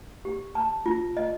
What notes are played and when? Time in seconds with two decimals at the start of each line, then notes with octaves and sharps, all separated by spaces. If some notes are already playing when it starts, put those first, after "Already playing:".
0.25 G4
0.55 A5
0.86 F4
1.17 D#5